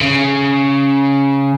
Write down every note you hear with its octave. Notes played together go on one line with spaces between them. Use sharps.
C#3